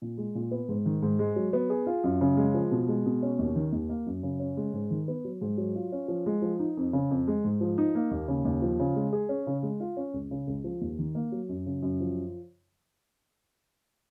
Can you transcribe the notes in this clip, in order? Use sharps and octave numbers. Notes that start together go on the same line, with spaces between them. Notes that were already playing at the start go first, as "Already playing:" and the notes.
A#2
G#3
A#2
B3
G#2
D#3
G#2
G#3
F#3
B3
G#4
F4
F#2
C#3
G#3
F3
B2
G#3
B2
C#4
D#2
D#3
D#2
A#3
F#2
C#3
C#4
G#3
G#2
D#3
B3
F#3
G#2
F#3
F4
C#4
F3
G#3
F3
D#4
F2
C#3
F2
G#3
G#2
F3
D#4
A#3
D#2
C#3
D#2
F3
C#3
G#3
G#4
C#4
C#3
G#3
F4
C#4
C#2
C#3
C#2
F3
D#2
D#3
A#3
F#3
F#2
C#3
F#2
F3